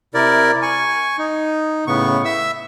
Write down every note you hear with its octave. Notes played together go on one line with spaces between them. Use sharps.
C3 E4 A#4 D5
G#5 C#6
D#4
A2 C#3 B3 C#6
E5 E6